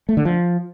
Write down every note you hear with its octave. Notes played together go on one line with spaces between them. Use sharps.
A3
D3
F3